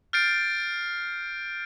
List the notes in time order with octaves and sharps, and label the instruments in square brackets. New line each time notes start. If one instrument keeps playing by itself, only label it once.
[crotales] F6 G6 A6 C7 D7